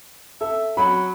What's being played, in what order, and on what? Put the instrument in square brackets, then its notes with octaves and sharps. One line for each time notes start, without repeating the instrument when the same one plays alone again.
[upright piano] A4 [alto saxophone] E5
[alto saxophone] F#3 [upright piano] B5